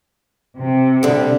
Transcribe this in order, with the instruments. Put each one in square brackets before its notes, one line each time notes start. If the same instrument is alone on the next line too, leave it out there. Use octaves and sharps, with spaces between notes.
[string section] C3
[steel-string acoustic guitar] D3 G3